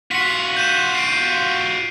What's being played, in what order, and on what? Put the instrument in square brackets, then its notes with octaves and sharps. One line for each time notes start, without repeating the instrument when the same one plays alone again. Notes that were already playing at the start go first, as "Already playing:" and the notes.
[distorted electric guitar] F4 F#4 [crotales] B6 C#7
[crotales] G6 D#7 E7
C7 D7